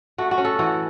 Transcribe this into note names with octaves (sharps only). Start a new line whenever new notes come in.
A3 F#4
F#4
C#4
A4
E3 F#4